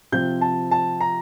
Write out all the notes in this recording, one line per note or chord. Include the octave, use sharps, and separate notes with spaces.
C3 F3 C4 G6
A5
A5
A#5